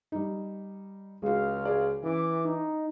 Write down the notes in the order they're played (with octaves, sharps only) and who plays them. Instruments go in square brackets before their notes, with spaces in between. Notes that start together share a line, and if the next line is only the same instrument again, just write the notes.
[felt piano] G3 D#4
[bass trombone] C#2 [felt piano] G#3 F#4 [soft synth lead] F5
[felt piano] F#4 G#4 D5
[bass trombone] E3 [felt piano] C#4 [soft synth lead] D6
[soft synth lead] D#4